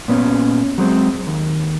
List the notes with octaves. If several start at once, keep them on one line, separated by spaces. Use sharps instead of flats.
A#2 B3 C#4
F#3 G#3 C4
D#2